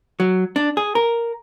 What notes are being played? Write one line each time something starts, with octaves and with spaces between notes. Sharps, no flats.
F#3
D4
G#4
A#4